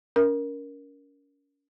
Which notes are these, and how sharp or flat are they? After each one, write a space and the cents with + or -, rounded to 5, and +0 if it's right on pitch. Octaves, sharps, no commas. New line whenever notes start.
C#4 +35 A#4 +10